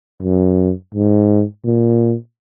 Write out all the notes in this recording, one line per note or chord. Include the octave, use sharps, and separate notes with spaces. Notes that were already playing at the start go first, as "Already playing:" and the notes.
F#2
G#2
A#2